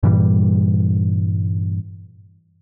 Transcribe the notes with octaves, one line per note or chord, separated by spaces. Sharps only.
G2 A#2 E3 G3